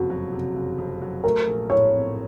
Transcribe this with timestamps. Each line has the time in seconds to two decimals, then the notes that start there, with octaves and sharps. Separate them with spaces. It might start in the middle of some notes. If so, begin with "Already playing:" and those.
Already playing: F#1 F2 C3 F#4
0.10 F#3
0.33 C3
0.56 F#1
0.78 F2
1.02 F#3
1.24 A3 A#4
1.47 A#1
1.70 A2 C#5
1.93 C4